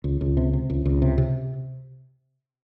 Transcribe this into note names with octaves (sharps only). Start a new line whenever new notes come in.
C#2
C#2
C3
C3
C#2
C#2
C3
C3